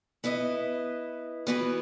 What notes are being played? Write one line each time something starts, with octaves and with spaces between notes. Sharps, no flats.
B3 E4 B4 D#5
E3 B3 F#4 B4